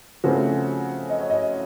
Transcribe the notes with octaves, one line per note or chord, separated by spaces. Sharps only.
C#3 F3 A3 C4 F#4
D#5
C#5
D#5